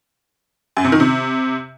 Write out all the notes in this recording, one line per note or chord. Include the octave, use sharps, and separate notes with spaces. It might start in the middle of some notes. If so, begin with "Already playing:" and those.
F#2
C3
D#3
C3